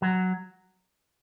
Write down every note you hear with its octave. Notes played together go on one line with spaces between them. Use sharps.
F#3